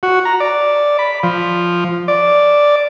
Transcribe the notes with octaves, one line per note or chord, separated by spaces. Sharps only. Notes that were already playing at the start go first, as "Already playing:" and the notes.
F#4
A#5
D5
B5
F3
D5